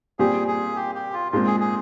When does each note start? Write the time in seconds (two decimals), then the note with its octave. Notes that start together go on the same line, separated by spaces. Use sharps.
0.19 A#2 G3 C4 G4 G#4
0.48 G#4
0.76 G4
0.95 G4
1.14 F4
1.32 A#2 G#3 C4 F4
1.47 G#4
1.60 G#4